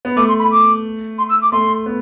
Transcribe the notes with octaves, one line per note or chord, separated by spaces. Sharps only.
B3
A3 D6
C6
B5
D6
C6
E6
D6
A3 C6
B3